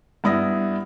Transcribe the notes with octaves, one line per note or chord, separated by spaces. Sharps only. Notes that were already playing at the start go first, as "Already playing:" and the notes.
G2 B3 E4 D5 D#6 A#6